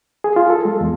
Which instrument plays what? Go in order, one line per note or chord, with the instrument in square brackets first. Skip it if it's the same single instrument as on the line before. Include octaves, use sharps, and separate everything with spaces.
[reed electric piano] G#4
F4
A4
G#3
E2